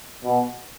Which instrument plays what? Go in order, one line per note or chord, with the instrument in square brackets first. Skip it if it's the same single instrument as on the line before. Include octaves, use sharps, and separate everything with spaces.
[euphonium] B2